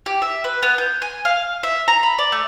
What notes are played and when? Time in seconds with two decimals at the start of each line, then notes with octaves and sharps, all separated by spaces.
0.06 G4
0.22 E5
0.44 B4
0.63 B3
0.78 G6
1.02 G#5
1.25 F5
1.63 E5
1.88 A#5
2.03 B5
2.18 D5
2.32 A3